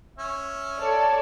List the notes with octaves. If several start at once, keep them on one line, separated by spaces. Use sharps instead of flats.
C#4 E5
A4 C#5 D5